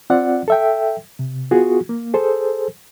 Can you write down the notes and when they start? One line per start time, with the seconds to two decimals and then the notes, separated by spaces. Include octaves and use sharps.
0.10 C4 F4 D5 F#5
0.48 A4 E5 G5
1.19 C3
1.51 B3 F4 F#4 G#4
1.89 A#3
2.14 G#4 A4 C5